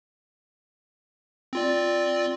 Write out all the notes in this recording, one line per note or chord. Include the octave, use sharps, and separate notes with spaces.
C4 F4 D5